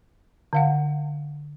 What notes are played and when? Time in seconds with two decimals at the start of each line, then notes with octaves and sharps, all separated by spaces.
0.53 D3 F5 F#5